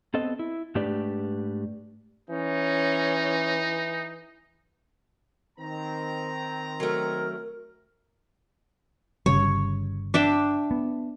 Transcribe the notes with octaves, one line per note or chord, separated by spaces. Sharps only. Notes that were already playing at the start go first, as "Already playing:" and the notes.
B3 C4 A4 D#5
E4
G#2 A3 D4 G4 B4 D5
E3 C#4 D#4
D#3 C4 A#5
F#3 A3 A#4
G1 C#3 G3 C#5
D4 E5 G5
B3